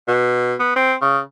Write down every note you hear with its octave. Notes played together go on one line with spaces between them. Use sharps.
B2
B3
C4
C#3